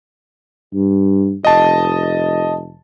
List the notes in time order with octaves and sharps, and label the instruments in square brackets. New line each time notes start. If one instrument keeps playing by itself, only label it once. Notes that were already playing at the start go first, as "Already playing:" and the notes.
[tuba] G2
[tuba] F1 [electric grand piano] D#5 A5